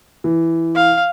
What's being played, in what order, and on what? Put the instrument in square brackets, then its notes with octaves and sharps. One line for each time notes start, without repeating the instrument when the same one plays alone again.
[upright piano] E3
[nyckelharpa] F5